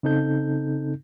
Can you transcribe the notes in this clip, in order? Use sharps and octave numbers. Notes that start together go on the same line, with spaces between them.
C#3 C4 D#4 A4 G6